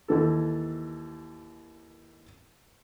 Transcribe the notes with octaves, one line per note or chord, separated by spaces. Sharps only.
D#2 E3 A4